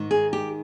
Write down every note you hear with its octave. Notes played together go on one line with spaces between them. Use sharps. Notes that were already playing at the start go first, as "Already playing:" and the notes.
Already playing: G#2 D#3
G#4
G4